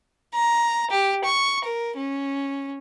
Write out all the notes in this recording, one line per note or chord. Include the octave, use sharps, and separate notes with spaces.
A#5
G4
C#6
A#4
C#4